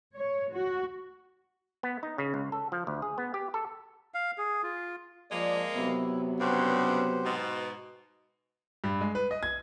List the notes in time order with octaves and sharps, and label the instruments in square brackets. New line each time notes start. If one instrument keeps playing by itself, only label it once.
[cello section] C#5
F#4
[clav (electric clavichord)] B3
D#4
C#3
C#2
A4
F3
D2
G#4
B3
G4
A4
[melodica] F5
G#4
F4
[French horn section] F3 D5 [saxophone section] G#3 A#3
[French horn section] C3 F#3 B3 [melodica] E4
[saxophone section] G2 C#3 [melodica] G4 C5 F#5
[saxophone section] G#2 B2
[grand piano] G2
G#3
B4
D#5
G#6